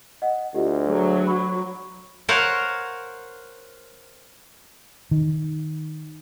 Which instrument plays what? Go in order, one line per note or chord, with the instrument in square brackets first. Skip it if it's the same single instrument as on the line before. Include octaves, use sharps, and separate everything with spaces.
[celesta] D#5 F#5
[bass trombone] D2 [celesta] F4 G4 D#5
[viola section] F#3 [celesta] F#4 G#4
[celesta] B5 C#6
[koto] A#4 C5 C#5 F5 F#5
[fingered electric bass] D#3